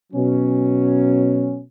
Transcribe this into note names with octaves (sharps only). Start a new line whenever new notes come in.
B2 F#3 C#4